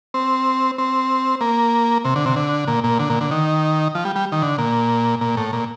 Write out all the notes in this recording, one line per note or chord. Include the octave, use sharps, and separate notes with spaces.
C4
C4
A#3
C3
D3
C3
D3
A#2
A#2
D3
A#2
D3
D#3
F3
G3
G3
D#3
D3
A#2
A#2
A2
A#2